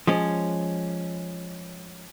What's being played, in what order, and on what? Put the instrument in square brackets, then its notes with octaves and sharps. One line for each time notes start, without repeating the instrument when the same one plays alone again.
[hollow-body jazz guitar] F3 G#3 C#4